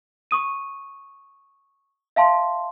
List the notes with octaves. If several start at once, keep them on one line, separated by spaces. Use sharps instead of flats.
C#6 D#6 D#7
E5 F5 A5 C6